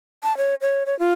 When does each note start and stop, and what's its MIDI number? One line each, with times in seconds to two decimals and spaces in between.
0.23 0.36 81
0.37 0.55 73
0.61 0.84 73
0.86 0.97 73
0.99 1.13 65